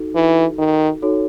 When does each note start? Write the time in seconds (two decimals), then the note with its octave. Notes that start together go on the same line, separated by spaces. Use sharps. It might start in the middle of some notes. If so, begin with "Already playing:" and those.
Already playing: D#4 F#4 A4
0.15 E3
0.59 D#3
1.02 D#4 F#4 A4 C#5